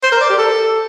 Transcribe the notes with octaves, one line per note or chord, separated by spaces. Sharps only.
C5
A#4
D5
G4
A4